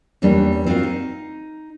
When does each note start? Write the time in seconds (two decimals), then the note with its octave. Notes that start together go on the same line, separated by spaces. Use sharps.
0.22 E2 E3 G3 A#3 C#4 D4
0.66 C4 F4 F#4 A#4 F5
0.83 D#4